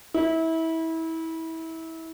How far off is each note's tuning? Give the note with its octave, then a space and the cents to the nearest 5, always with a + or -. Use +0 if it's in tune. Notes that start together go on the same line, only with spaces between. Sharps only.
E4 -25